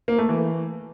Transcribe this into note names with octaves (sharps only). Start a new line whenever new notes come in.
A#3
A3
E3